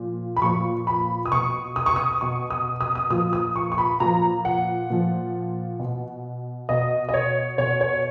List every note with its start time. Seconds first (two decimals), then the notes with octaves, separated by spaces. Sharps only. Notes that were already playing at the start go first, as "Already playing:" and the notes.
Already playing: A#2 F3
0.37 B5
0.42 A#2 F3 C#6
0.87 B5
1.25 D#6
1.31 B2 C#6
1.76 D#6
1.86 C#6
1.96 D#6
2.21 B2 C#6
2.50 D#6
2.81 D#6
2.95 D#6
3.10 A#2 F3 D#6
3.33 D#6
3.56 C#6
3.72 C#6
3.78 B5
4.00 A#2 F3 A#5
4.45 F#5
4.90 A#2 F3
5.79 B2
6.69 B2 D#5
7.09 D#5
7.14 C#5
7.58 B2 C#5
7.81 C#5